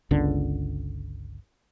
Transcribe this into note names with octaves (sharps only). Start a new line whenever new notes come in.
G1 C#2 D3